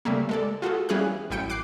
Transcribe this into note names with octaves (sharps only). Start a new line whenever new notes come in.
C#3 G3 A3 A#3
G#3 A4 D5
F4 F#4 G#4 A4
E3 G3 C#4 G#4 F5 F#6
A1 F#2 E4 G5 C#7 D7
D6 F#6 C7 D7